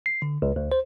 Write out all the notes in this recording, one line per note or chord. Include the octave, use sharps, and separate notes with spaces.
C7
D3
C#2
D2
C5